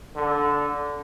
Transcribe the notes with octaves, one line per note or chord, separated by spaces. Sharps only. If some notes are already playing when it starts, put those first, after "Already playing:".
D3